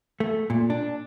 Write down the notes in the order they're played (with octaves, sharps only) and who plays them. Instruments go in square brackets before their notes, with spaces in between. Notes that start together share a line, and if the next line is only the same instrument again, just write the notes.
[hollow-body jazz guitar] A3
A#2
D4